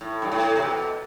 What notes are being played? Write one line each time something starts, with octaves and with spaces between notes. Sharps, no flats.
A2
G2
A2
C3
B2